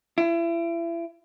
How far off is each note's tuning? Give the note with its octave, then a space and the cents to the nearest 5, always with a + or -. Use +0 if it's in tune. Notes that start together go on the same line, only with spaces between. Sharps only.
E4 +30